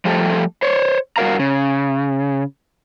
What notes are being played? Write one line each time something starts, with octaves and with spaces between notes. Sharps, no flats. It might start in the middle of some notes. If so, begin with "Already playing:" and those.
F3 G3 A3 G4 A4
C5 C#5
G2 F#4 A#4 F5 A#5
C#3